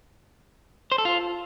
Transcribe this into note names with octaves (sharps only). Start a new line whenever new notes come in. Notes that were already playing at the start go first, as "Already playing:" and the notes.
C5
A4
F4